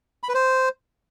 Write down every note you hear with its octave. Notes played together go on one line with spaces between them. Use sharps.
B5
B4
C5